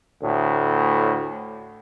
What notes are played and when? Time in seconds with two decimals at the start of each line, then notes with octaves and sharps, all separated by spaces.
0.22 D2 A2